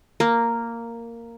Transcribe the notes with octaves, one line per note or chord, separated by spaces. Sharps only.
A#3